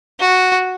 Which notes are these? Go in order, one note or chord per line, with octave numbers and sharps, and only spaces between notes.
F#4